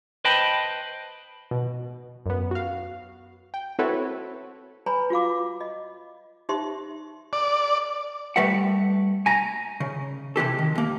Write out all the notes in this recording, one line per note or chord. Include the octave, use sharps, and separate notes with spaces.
B4 C5 D#5 G5 A5 B5
B2
F#2 B3
F#4 F5
G5
C4 E4 F#4 A4 B4 C#5
B4 C#5 G#5 A#5 B5
F4 F#4 F5 D6
D#5
D#4 G4 C5 E5 C6
D5
G3 A3 B4 E5 F#5
G#5 A#5
C#3
C3 E3 G4 A4
D#3
D#2 A#3